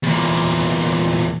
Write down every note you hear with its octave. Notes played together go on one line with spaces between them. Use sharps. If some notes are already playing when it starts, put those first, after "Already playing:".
E2 A#2